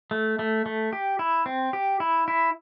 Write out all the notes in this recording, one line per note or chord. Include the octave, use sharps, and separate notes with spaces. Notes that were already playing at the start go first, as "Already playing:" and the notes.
A3
A3
A3
G4
E4
C4
G4
E4
E4